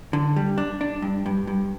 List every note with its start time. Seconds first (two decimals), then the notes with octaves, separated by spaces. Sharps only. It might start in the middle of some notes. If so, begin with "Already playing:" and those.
0.13 D3
0.36 G3
0.58 D4
0.81 D4
1.02 G2
1.26 G2
1.47 G2